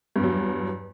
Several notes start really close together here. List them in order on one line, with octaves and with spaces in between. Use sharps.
G2 E2 F#3